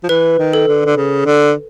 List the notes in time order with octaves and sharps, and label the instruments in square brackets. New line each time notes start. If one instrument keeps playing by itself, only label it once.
[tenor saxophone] F3
[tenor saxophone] E3 [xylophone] B4
[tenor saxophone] D#3
[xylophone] A4
[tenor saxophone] D3
D3
C#3
D3